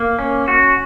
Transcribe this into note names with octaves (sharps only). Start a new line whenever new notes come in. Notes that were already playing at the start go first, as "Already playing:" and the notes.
Already playing: A#3
C#4
F#4